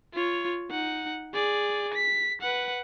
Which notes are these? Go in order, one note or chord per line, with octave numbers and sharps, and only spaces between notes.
F4 C#5
D#4 F#5
G#4 D5
B6
B4 F#5